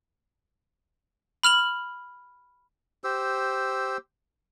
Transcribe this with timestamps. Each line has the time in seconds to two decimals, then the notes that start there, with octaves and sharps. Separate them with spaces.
1.43 B5 F6 F7 F#7
3.04 G4 C5 E6